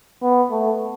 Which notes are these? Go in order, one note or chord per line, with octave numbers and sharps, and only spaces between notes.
B3
A3